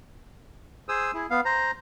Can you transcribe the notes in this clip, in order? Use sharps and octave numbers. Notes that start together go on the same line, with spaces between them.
G#4 C5 D#6 E6
E4 G#4
B3 F5
C5 A#5